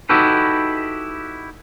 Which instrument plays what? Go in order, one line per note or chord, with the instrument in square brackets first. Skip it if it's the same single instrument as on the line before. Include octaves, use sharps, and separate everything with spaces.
[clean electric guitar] D#4 E4 F#4 G4 A4 B4